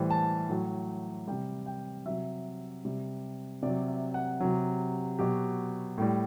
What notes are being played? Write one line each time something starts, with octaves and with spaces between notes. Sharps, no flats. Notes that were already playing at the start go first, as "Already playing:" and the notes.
Already playing: A2 E3 G3 C5
A5
A2 F#3
C3 G3 G5
G5
C3 F#3 E5
C3 G3
C3 F#3 D5
E5
F#5
C3 F#3
B2 F#3 G4
A2 G3